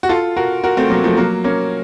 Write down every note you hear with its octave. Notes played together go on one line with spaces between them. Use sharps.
F#4
F4 A4
F#4 A#4
F#4 A#4
A3 C4
F#3 A#3
F3 A3
F#3 A#3
A#3 C#4